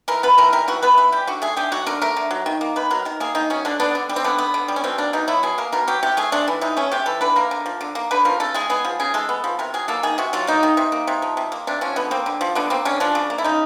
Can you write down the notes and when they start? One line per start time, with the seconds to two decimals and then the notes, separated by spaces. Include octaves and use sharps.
0.08 E3 A#4
0.23 B3 B4
0.38 E3 A#4
0.53 G3 A#4
0.68 E3 F#4
0.82 B3 B4
0.97 E3 B4
1.12 G3 G4
1.27 D3 F#4
1.42 A3 G#4
1.57 D3 G4
1.72 F#3 F#4
1.86 D3 A#4
2.02 A3 A#4
2.16 D3
2.31 F#3
2.46 D#3
2.61 A#3
2.76 D#3 B4
2.91 F#3 A#4
3.05 D#3 A#4
3.20 A#3 G#4
3.35 D#3 D#4
3.50 F#3 C#4
3.65 D3 D4
3.80 B3 D4
3.95 D3
4.09 G3
4.16 C4
4.24 D3 B3
4.38 B3
4.54 D3
4.68 G3
4.76 C#4
4.84 B2 C4
4.98 A#3 D4
5.13 B2 D#4
5.28 F#3 E4
5.43 B2 G#4
5.58 A#3 A#4
5.72 B2 A#4
5.88 F#3 G4
6.03 C3 G4
6.17 A3 G#4
6.32 C3 D4
6.48 E3
6.61 C3 D#4
6.77 A3 C#4
6.92 C3 G4
7.06 E3 A4
7.21 D3 B4
7.36 A#3 A#4
7.51 D3
7.66 F3
7.81 D3
7.95 A#3
8.11 D3 B4
8.25 F3 A#4
8.40 C#3 A4
8.54 G#3 G#4
8.70 B3 G#4
8.85 F3
9.00 C#3 G#4
9.14 G#3 A4
9.29 B3
9.44 F3
9.59 C3 A#4
9.74 F#3 G#4
9.88 A#3 A4
10.03 D#3 G#4
10.18 C3 F#4
10.33 F#3 F4
10.47 A#3 D#4
10.63 D#3
10.77 C3
10.92 A#3
11.07 C3
11.22 F3
11.37 C3
11.52 A#3
11.67 C3 D4
11.81 F3 C#4
11.96 D3 B3
12.11 A#3 C4
12.26 D3
12.41 F3
12.55 D3 B3
12.70 A#3 C4
12.85 D3 C#4
13.00 F3 D4
13.15 C#3
13.30 A#3
13.38 E4
13.44 C#3 D#4